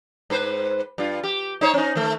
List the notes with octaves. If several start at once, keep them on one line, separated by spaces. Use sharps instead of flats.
G#2 B4 C5
G2 F4
G4
D#4 C5 C#5
C#4 D#4
D#3 A3